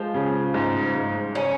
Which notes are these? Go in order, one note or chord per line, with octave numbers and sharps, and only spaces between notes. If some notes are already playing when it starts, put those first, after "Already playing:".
Already playing: F3 G#3
C#3
G#2
G#2
C#3 C#4